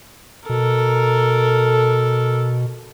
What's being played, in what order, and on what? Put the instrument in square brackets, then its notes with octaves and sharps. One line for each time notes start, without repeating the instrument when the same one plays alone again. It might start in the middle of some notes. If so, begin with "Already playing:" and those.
[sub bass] B2 [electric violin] A4 A#4